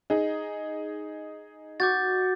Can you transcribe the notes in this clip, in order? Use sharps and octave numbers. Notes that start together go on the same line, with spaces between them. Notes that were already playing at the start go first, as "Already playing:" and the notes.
D#4 G#4
F#4 D6 G6 A6